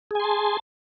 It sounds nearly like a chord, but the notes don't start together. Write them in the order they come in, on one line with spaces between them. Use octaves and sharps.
G#4 G#5 C6 A5